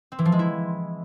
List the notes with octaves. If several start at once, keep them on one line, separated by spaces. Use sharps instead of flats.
C4
E3
F3
G#3
E4